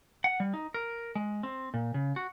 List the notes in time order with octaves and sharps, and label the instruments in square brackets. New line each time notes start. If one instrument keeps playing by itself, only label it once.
[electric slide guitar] F#5
G3
D#4
A#4
G#3
C4
A#2
C#3
F#4